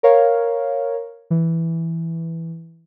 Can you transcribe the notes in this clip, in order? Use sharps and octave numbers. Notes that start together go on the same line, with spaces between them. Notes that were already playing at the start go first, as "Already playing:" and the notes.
A#4 C#5 F5
E3